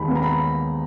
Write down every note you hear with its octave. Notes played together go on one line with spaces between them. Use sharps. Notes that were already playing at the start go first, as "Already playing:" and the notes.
Already playing: D#2 G#3 B5
B3
A#5
B5